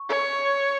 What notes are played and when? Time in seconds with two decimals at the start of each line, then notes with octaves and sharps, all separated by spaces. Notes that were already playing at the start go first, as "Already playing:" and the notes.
Already playing: C#6
0.09 C#5